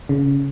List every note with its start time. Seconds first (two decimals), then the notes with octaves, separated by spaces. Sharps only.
0.09 C#3